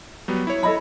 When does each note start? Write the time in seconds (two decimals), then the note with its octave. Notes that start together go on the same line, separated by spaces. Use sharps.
0.28 F#3 G3 B3
0.47 E4 C#5
0.63 A4 D#5 B5